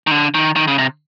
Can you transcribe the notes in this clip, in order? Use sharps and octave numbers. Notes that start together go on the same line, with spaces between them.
D#3
D3
D#3
D#3
C#3
C3